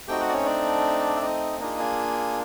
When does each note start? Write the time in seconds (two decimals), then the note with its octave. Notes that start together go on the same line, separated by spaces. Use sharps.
0.08 A3 C4 D#4 F#4 G4 G5
0.20 F#4 F#5
0.29 D5
0.33 C#4 C#5
0.46 D4 D5
1.16 E5
1.22 D#4 D#5
1.60 A#3 D4 D#4 F4 G#4 D#5
1.79 G#4 G#5